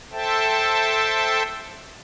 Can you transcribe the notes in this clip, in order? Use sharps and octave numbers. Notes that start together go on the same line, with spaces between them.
A4 C5 E5 G5 A5